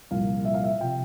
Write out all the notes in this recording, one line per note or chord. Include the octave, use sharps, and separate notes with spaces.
C2 A#2 F3 F5
E5
F5
E5
C3 F3 G5